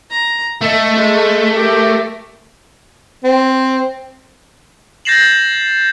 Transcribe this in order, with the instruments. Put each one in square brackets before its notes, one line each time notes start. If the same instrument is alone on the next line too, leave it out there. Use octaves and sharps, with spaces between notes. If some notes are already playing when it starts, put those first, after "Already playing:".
[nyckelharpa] A#5
[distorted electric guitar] A3 [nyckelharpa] A4 D#5
[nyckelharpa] G#3
G4 A#4
[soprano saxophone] C4
[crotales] G6 A6 A#6 C7 E7 F#7